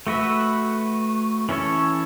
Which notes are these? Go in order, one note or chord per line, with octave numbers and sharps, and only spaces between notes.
A3 F#4 B4 E5
E3 C#4 A4 C#5